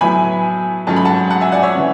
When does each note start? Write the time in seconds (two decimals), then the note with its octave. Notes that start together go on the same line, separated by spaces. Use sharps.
0.01 A2 F#3 B3 E4 G#5 B5
0.87 G#2 F#3 A3 C#4 A5
0.96 B5
1.04 F#5 A5
1.30 F#5 A5
1.41 E5 G#5
1.52 D5 F#5
1.63 C#5 E5
1.75 C#3 E3